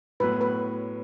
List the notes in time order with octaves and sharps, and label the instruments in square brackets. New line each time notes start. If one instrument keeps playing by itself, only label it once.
[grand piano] A2 F#3 B3 [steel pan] B4
[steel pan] B4